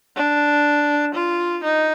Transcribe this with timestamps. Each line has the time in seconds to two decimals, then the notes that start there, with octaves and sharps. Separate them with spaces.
0.16 D4
1.14 F4
1.64 D#4